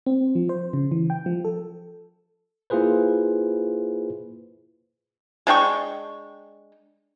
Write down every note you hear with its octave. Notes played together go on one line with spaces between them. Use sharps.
C4
F3
C5
C#3
E3
G5
F3
A4
A#3 E4 F4 G#4 B4 C5
G#3 D4 G5 C#6